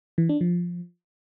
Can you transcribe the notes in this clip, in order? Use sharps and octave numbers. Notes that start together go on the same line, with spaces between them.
E3
D4
F3